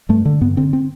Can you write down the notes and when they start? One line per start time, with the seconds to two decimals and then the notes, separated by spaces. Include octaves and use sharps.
0.09 G2 A3
0.25 D3
0.41 G2 B3
0.57 D3 C4
0.73 C4